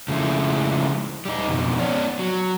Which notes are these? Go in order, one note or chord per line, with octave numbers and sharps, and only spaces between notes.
C#3 F3 G#3 A3 E4
G3 D#4
F2 B2 D#3
B3 C#5 D5
F#3